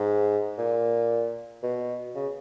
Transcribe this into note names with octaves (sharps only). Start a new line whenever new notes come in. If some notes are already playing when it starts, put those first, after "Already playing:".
Already playing: G#2
A#2
B2
C#3